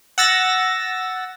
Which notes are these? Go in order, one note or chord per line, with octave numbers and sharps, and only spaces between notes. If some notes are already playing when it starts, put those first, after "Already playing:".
F#5 E6 A6 A#6